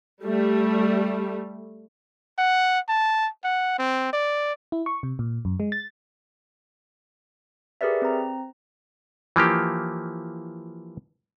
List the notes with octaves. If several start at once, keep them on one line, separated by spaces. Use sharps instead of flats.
G3 A3
F#5
A5
F#5
C4
D5
E4
C#6
C3
A#2
F#2
G#3
A6
G4 G#4 A#4 B4 D5 E5
C4 A#5
E3 F3 A#3 G4